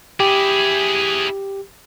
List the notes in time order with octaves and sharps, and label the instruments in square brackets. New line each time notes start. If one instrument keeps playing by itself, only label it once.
[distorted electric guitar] E4 G#4 [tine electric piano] G4